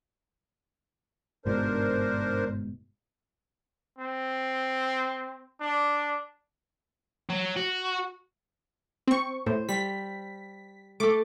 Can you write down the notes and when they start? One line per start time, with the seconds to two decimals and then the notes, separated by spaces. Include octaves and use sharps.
1.46 G1 G#2 B2 D4 A#4 C5
3.99 C4
5.60 D4
7.29 F#3
7.56 F#4
9.07 C4 C#6
9.46 A2 C5
9.69 G3 B6
11.00 A3 A4 D6